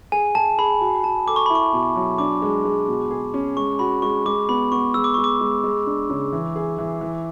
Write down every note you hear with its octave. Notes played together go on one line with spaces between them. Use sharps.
G#4 G#5
G#4 A5
G#4 B5
F#4
F#4 A5
A4 D6
C#6
E4 B5
C#6
B2
F#3
D4 D6
G#3
G#3
B2
G#4
C#4
G#3 C#6
F#4 B5
G#3 C#6
G#3 D6
B3 B5
B3 C#6
G#3 E6
D6
G#3 C#6
D6
G#3
G#3
D4
C#3
E3
G#4
E3
E3